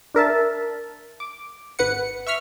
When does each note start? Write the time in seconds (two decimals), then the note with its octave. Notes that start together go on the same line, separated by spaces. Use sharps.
0.14 D4 A#4 E5 A5
1.20 D6
1.79 G#1 B4 F#5 C#7
2.27 E5 C#6 F6 B6